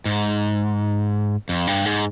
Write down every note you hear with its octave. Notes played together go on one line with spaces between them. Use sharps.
G#2
F2
G2
G#2